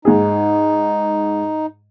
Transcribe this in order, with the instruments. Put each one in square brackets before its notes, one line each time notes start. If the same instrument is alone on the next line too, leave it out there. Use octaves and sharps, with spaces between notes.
[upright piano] G#2 G#4 [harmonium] D#4